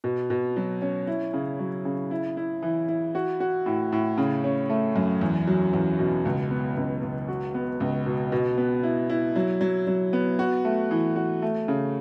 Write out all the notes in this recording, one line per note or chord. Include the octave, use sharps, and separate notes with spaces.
B2
B2
F#3
C#4
E4
C#3
F#3
C#3
E4
E4
E3
E4
F#4
F#4
A2
A2
C#3
C#4
A3
F#2
E2
F#3
E2
B2
C#2
B3
C#2
C#2
F#4
B3
C#2
B2
B2
B3
E4
E4
F#3
F#3
F#3
B3
F#4
A3
E3
F#4
A3
C#3